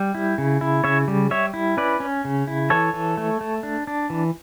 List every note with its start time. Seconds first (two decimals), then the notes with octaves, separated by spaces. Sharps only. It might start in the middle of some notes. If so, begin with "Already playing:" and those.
Already playing: G3
0.15 E4
0.38 C#3
0.61 E4
0.84 C#3 C#5 E5
1.08 G3
1.31 G3 C#5 E5
1.54 E4
1.77 C#4 B4 D5
2.00 C#4
2.25 C#3
2.47 E4
2.70 E3 A4 C#5
2.93 E3
3.17 A3
3.41 A3
3.63 D4
3.87 D4
4.10 E3